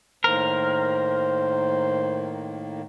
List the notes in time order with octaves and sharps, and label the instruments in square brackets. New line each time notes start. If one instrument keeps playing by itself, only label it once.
[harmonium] A2 D#3 A#3 [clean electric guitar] A#4 [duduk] C5